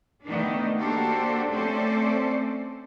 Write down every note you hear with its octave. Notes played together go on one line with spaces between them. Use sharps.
D#3 A3 B3 D4
A#3 D4 F#4 G4 A4 C5
A3 C4 C#4 A4 C5 D5